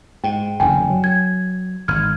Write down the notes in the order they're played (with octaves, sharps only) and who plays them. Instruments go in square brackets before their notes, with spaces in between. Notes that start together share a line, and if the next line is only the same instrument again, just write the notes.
[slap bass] G#2 [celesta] G5
[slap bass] F#1 E2 D3 [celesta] G5 G#5
[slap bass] F#3
[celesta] G#6
[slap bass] G#1 [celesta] F6 G#6